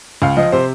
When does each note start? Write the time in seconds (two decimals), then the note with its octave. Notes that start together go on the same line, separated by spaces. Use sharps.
0.22 C#2 F5
0.37 F3 D#5
0.52 C3 C5